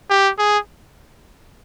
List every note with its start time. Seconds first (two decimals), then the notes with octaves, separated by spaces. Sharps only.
0.10 G4
0.38 G#4